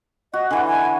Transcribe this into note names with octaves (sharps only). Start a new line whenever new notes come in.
F#4 D#5
D3 E3 G#5
G#5